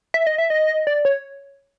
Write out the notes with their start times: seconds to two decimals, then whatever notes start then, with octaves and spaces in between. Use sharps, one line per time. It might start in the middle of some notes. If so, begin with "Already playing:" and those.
0.14 E5
0.27 D#5
0.38 E5
0.50 D#5
0.87 D5
1.05 C#5